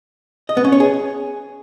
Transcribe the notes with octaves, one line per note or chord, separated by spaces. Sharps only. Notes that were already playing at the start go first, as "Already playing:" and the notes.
D#5
B3
C#4
C#5
G#4